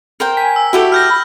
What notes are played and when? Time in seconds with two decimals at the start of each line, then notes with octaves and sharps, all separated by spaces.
0.20 A#4 C5 G5
0.37 G#5 B6
0.56 E6
0.73 E4 F#4 G4 A4
0.92 F6 G6 A#6
1.10 B5